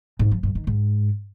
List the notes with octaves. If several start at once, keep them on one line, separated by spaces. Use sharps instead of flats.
G#2
F3
G2
D#3
G#2